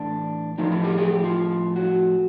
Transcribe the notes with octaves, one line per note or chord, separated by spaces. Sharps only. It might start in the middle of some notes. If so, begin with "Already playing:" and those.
Already playing: A2 E3 D4
A2 F3 D#4
E4
G4
G#4
G4
F4
F#4